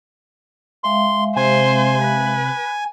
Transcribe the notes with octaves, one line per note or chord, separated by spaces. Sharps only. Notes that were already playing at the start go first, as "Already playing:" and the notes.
G#3 E5 F5 C6
C3 C5 G#5
B4